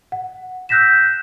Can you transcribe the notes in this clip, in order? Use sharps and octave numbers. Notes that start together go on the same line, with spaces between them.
F#5
E6 F#6 G6 A#6 B6 E7